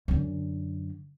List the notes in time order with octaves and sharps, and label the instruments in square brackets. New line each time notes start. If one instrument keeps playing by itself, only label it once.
[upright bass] F#2 D3